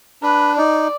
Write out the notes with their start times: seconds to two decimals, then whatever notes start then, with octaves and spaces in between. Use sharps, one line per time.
0.22 D4 B4
0.57 D#4 D5